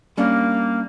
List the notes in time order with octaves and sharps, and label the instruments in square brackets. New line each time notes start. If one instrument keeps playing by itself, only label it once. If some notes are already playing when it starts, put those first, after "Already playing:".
[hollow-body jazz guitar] G3 C#4 D4 [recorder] A#3